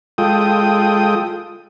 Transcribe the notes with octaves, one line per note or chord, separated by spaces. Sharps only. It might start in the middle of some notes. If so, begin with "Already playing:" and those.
G#3 F4 A4 G5 D#6